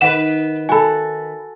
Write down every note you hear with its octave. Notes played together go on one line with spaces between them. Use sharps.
D#3 B4 F#5 E7
F#4 A4 G#5 B5